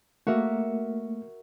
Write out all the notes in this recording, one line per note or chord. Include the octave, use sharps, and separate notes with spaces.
A3 A#3 F#4 A#4 E5